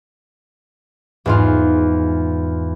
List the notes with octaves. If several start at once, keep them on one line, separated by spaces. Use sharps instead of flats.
E2 G#2 F4